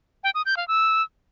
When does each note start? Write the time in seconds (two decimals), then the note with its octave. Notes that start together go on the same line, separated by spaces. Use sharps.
0.24 G5
0.35 D#6
0.46 G6
0.57 F5
0.68 E6